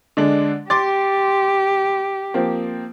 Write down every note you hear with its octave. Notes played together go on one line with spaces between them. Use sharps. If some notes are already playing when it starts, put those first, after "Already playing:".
D3 G#3 D4
G4 C6 D6 A6
F3 A#3 C4